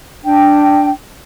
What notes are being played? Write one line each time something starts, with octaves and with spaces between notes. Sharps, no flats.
D4 G5